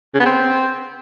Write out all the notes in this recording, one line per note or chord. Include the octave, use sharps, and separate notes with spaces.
C#3
B3
C4